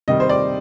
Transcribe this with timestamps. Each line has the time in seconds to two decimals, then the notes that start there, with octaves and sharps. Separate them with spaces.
0.08 C3 D#3 G3 D#5
0.20 C5
0.29 D5